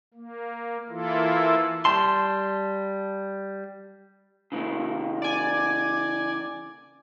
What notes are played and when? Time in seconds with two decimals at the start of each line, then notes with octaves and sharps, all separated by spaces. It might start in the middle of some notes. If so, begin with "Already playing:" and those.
0.14 A#3
0.89 E3 A#3 E4 F4 A4
1.85 G3 A5 C6
4.52 C#3 E3 A#3
5.22 D5 G#5